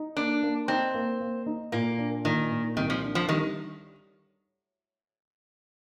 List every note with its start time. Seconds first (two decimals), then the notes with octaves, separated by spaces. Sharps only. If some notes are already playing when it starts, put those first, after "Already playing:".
Already playing: D#4
0.17 A#3 D4
0.43 A#3
0.68 C4 D#4
0.94 A#3
1.20 A#3
1.46 D#4
1.72 A#2 A#3
1.98 D4
2.25 A#2 D#3
2.51 A#2
2.77 C2 D#3
2.90 F3
3.03 D4
3.15 F3
3.29 D#3 G3